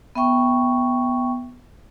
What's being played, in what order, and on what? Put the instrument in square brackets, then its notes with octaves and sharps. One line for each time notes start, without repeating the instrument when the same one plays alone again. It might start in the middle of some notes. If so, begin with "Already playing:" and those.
[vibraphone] B3 E5 G5 C#6